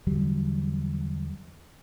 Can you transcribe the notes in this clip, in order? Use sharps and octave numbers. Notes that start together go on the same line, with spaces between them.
E2 D3 F#3 G3